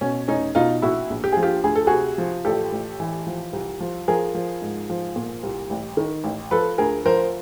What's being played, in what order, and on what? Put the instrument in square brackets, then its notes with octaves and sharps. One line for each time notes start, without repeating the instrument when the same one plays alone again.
[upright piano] B2 C#4
F1 C#4 D#4
B2 D#4 F4
A#1 E4 F#4
A#1
G4
F3 G#4
F4 G4
D2 G#4
A4
C3 F#4 G#4
F3
A1 G4 A4
A1
E3
F3
C2
F3
F3 G#4 A#4
F3
G#2
F3
A#2
C2
A1
D#3
A1
F3 A4 B4
D2 G#4 A#4
F3 A#4 C5